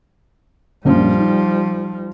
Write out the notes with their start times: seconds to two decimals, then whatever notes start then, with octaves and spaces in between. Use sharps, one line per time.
0.85 A#1 F#2 A#2 F3 G3
1.20 D#4